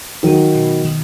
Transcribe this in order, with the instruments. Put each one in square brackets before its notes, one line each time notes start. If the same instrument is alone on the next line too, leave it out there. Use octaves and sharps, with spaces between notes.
[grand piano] D#3 F#3 [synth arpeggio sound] D#4
[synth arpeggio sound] B2
D#3